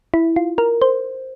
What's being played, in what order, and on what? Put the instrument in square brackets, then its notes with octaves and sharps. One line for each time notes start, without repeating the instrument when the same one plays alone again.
[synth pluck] E4
F4
A#4
C5